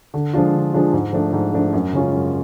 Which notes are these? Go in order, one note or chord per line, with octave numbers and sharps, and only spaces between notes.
D3
F3 G#3 D4 F4
D3
F3 G#3 D4 F4
G#2
F3 A3 D4
G#2
F3 A3 D4
F#2
C#3 G#3 C#4 F4
F#2